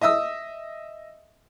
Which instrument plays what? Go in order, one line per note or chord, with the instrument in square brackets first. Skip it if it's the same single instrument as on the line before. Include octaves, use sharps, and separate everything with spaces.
[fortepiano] D#5 E5 D#6 E6